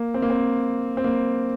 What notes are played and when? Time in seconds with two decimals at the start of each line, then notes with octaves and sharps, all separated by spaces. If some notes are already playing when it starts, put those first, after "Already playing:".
Already playing: A#3
0.14 C4
0.22 A#3
0.30 C4
0.97 C4
1.04 A#3